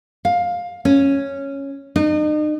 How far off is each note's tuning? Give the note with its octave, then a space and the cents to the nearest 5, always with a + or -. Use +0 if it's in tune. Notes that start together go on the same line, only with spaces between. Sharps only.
F5 +15
C#4 -5
D#4 -40